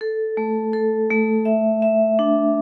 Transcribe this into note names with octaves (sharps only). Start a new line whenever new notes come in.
A4
A3
A4
A3
E5
E5
D4